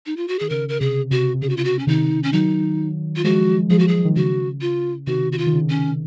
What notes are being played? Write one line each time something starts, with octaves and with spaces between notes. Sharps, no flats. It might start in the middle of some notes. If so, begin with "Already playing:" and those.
D#4
F4
F#4
D#3 G#4
C#3 A#4
A#4
C3 G#4
C3 F#4
C3
C#3 G#4
F#4
F4
F#4
C#4
C3 D#3 D#4
C#4
D#3 F#3 D#4
F4
F3 G#3 F#4
F3 G#3 G#4
F#4
G#4
D#3
C#3 F#4
F4
C3 D#3 F#4
F#4
F4
D#3
C#3
C#4